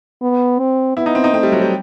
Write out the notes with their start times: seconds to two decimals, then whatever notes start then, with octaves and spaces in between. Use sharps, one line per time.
0.22 B3
0.59 C4
0.97 B3 E4
1.06 D#4
1.15 C4
1.24 D#4
1.33 A3 C4
1.43 G3
1.52 F#3
1.62 G3